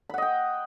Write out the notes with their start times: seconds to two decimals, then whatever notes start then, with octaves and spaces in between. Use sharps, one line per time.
0.09 B5
0.14 F#5
0.18 D#5
0.22 G5